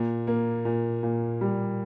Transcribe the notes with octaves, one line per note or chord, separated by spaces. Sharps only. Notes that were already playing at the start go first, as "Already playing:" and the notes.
Already playing: A#2
A#3
A#2
A#2
G3